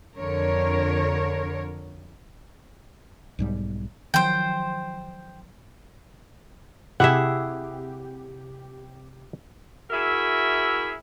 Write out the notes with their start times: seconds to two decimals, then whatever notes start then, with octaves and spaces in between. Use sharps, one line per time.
0.18 F2 D3 A#4 C#5
3.39 B1 G#2 G3
4.14 D#3 F3 F#3 C5 G5
7.00 C3 E4 G4 G#4 E5 F#5
9.90 E4 F#4 G#4 A#4 E5